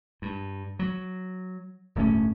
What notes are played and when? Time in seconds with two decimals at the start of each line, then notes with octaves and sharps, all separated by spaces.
0.22 G2
0.79 F#3
1.95 D1 G1 A3 C#4